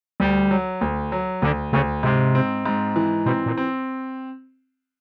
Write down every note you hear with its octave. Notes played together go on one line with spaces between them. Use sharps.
D2 G3
F#3
D2
F#3
D2 D3
D2 C#3
G#2 C3
C4
G#2
E3
B2 C4
A#2
C4